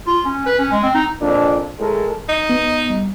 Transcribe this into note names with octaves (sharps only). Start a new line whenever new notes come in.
F4
C#4
B4
C#4
G#3
C4
D#4
F2 A#2 D4
A2 G#3 A4 A#4
D#4
B3
G3